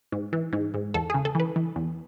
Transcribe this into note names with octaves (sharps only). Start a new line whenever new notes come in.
G#2
E3
G#2
G#2
E2 A4
C#3 G#4
A4
E3 B4
E3
E2